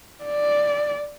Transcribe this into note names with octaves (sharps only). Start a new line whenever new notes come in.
D5